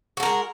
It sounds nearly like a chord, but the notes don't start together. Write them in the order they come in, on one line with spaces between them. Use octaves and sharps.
F#4 A4 A#4 G#3